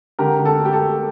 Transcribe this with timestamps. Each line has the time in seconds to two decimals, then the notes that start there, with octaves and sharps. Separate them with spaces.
0.19 D3 G4 A#4
0.39 D3
0.45 A4
0.59 A3
0.65 G4
0.73 A4
0.79 A3